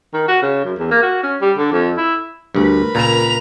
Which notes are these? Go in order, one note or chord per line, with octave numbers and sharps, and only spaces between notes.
D#3
F#4
C#3
F#2
E2
A#3
F#4
C#4
G3
D3
F2
E4
D2 G2 A#4 B4 B5
C#2 A#2 A#5 F7